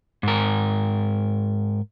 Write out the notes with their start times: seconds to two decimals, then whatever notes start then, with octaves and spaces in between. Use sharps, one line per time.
0.23 G#2 A#4